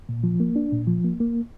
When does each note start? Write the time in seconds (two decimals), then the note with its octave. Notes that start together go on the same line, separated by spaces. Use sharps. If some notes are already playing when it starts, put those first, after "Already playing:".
0.09 A#2
0.24 F3
0.40 A#3
0.56 D4
0.72 A#2
0.87 F3
1.04 A#3
1.20 A#3